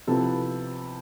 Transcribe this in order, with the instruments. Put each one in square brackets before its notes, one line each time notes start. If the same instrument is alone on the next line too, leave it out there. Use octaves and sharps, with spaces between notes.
[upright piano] C3 F3 B3 E4 A4